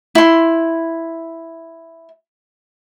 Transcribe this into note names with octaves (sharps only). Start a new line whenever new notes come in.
E4 C6